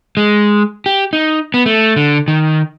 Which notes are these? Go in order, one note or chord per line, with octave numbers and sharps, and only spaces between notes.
G#3
G4
D#4
B3
A3
D3
D#3